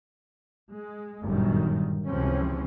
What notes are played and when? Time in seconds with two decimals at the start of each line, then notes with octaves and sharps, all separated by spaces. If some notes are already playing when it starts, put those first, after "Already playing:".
0.70 G#3
1.23 G1 F#2 A#2 D#3
2.07 C#2 C3 E3 F3 C4 C#4